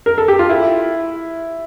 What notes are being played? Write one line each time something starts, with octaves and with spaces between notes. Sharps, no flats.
A#4
A4
G4
F4
E4